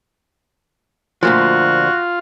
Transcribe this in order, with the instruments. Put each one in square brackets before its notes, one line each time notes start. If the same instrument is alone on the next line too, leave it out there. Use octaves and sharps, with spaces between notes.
[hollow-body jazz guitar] D2 A#2 F3 [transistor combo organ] F4 [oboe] F#4